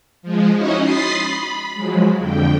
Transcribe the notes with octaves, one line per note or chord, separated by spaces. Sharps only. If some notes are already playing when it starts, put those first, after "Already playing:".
F3 G#3
C#4 D#4 E4 F#4 D#5
B5 C6 D#6 A6 B6 C7
B5
F3 F#3 G#3
F2 D3 G5